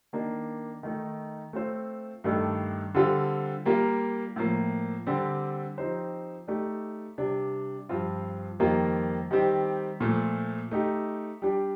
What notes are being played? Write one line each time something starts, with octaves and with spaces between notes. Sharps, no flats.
D#3 A#3 D4
D#3 A3 D#4
A3 C4 F4 C5
G2 D#3 A3 D4 A4
D3 G3 C4 F4 A4
G3 A#3 F4 A#4
A2 F3 A#3
D3 G3 C4 G4 D5
F3 C4 D#4 G4 C5
A3 D#4 G4 D5
C3 G3 D4
G2 F3 C4 F4
F2 D#3 G3 A#3 F4
D#3 G3 C4 G4
A#2 F3 A3
A3 D#4 G4
G3 D4 G4